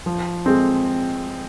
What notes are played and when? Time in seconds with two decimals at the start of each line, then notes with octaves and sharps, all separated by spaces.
0.06 F3
0.46 G#3 C4